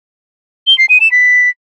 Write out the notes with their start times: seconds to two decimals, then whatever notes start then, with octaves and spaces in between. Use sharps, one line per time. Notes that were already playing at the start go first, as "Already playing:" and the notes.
0.67 G7
0.78 C7
0.89 D#7
1.00 E7
1.12 B6